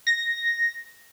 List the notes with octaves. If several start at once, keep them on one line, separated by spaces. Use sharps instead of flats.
A#6